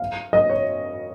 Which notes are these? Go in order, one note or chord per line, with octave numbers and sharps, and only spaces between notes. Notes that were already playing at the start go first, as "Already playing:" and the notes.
Already playing: F5
D#5
C#5